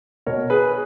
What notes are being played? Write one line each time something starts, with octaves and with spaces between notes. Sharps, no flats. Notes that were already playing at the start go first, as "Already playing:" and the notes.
B2 A#4 C#5
G#4 B4